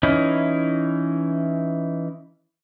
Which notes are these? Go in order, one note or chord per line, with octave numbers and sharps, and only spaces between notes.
E3 C#4 D#4 E4